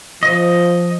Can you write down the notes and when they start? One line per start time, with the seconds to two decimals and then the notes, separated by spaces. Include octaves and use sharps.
0.23 F3 D#5